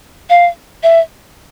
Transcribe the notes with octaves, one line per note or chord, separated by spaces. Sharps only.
F5
E5